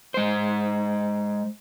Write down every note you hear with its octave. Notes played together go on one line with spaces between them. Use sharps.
G#3 C5